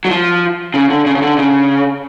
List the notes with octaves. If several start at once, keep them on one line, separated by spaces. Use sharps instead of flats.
F#3
F3
C#3
D3
C#3
C#3
D3
C#3